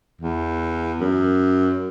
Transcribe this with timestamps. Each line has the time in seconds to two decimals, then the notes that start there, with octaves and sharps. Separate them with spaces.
0.21 E2
1.00 F#2